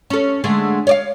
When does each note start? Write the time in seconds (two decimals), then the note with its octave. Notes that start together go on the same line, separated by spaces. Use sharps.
0.10 C#4 A4
0.44 D3 G#3 A3
0.87 C#5 D5 F5